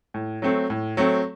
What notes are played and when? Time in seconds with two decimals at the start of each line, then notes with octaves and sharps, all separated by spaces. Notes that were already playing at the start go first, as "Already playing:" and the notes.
0.14 A2
0.42 F#3 A3 C4
0.70 A2
0.97 F#3 A3 C4